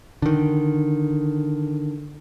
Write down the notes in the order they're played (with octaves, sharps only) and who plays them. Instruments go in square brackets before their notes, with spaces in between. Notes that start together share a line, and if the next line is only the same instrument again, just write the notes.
[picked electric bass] D3 D#3